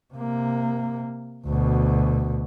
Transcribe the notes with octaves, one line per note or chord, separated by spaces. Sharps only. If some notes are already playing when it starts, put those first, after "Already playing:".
C3 A#3
D2 B2